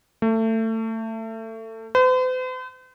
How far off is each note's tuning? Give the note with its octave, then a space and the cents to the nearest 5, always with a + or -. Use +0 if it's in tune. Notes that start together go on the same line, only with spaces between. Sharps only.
A3 +25
C5 -45